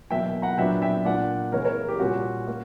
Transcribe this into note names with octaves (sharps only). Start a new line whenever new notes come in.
E2 B2 F#3 A#3 E5 G5
F#5 A#5
A#2 F#3 B3 D4 E5 G5
E5 G5
A#2 A#3 D4 D5 F#5
C#3 E3 A#3 C#4 A#4 C#5
A#4 C#5
G4
A#2 G3 C#4 F#4
A#3